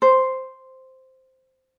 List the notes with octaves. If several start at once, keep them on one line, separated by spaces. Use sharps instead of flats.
C5